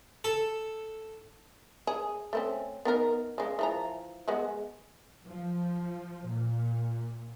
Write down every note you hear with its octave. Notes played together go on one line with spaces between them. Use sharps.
A4
G#4
A3 C4 C#4
B3 D#4 A#4
C#3 G#3
E3 F3 A#5
G#3 B3 F#4
F3
A#2